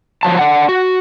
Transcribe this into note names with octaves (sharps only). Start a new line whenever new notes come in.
F3 F#3 A5
D4 F#5 A5
F#4